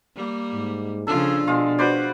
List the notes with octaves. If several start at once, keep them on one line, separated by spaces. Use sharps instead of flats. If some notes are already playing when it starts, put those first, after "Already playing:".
G3 A#3
G#2
C#3 F3 D4 F4 A4
B2 G#3 F4
F#4 B4 C5 D5